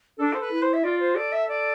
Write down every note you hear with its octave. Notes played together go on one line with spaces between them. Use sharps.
D4 A4
C5
B4
E4
C5
E5
F4 D5
C5
A4 D5
E5
D5